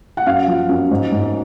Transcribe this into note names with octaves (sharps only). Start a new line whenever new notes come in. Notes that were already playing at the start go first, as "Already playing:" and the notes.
F#5
F#2 F5
F3
F#2
G#2
G#2